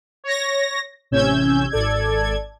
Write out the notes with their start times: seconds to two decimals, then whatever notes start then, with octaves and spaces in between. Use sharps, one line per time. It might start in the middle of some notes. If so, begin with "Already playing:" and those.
0.24 C#5 A#6
1.11 A1 C3 C#4 E6 G6 G#6
1.70 G#1 A4 D5 G#6